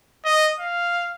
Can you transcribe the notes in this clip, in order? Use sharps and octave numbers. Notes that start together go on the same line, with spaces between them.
D#5
F5